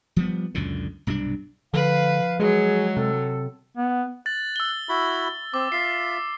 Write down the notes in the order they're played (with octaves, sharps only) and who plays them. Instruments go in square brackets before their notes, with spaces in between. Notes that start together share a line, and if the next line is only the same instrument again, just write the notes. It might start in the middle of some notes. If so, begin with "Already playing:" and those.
[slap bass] F3 G3 B3
C#2 F#2 A#2 D3
B1 G2 C3 D4
[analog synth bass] D3 [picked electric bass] F3 [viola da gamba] B4 [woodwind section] F5
[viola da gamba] F#3 [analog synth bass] G#3 [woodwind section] G#4
[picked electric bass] C3 [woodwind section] A4
[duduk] B3
[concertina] F#6 [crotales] A6
[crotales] E6 G7
[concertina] E4 F#4 B5
[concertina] C4 [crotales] D6
[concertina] F4 E5 [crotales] C7